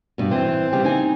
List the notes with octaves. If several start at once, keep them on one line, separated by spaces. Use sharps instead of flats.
G2 B2
E3 C4
C#3 G3 G4
D#4 G#5